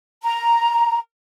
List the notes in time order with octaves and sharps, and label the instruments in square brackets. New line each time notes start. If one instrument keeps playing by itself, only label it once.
[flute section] A#5